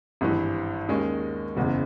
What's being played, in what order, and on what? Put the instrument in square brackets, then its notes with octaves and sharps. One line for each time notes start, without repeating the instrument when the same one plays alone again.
[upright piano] G#1 G2 E3
D#2 D#3 G#3 C#4
F#1 E2 C#3 E3